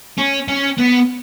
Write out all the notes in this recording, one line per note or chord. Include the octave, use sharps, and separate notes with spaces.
C#4
C#4
B3